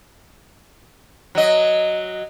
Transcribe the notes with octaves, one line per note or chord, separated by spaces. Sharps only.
F#3 D#5